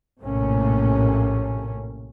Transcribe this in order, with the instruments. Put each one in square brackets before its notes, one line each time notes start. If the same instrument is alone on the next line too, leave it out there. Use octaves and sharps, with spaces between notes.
[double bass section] A#1 A2 C3 A3 A#3 C#4